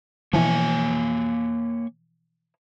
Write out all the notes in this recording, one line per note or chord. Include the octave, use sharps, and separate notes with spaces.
B2 E3 F3 A#3 C#5 G#5